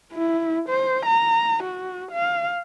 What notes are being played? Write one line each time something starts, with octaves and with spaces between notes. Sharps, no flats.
E4
C5
A#5
F#4
F5